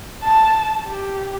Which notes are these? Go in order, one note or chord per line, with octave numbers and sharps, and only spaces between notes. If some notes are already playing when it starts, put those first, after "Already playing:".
A5
G4